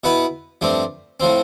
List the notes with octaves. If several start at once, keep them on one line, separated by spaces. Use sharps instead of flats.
B2 B3 E4 B4
G2 F3 A3 C4
A2 F3 C4